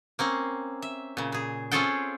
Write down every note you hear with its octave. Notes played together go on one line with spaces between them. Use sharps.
A#3 C4 C#4
E5
A#2 C#3
A#2 G#4
C4 C#4 F4 G#4 A4 G5